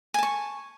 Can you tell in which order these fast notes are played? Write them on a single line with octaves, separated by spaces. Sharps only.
G#5 A5 C#6